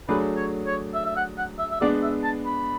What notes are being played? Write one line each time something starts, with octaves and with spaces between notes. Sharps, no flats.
F#3 A3 D4 G#4 B4
C#5
C#5
E5
E5
F#5
F#5
E5
E5
G#3 B3 D4 D5
E5
A5
B5